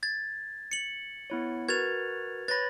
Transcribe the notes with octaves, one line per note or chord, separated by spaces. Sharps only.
G#6 A6
C#7 F#7
B3 E4 C#5
F#4 A#4 B4 G#6 A6 F7
B4 C#5 B5 A6 A#6